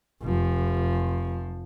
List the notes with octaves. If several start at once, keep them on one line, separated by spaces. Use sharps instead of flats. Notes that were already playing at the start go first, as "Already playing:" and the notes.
F1 F3